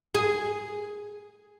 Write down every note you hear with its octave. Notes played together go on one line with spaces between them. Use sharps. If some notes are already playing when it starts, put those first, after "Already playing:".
G#4